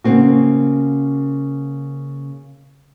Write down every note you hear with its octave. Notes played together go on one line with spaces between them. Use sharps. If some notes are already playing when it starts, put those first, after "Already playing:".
C#3 A#3 C4 F#4